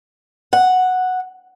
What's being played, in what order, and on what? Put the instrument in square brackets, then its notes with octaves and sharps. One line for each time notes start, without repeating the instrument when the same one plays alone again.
[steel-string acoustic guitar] F#5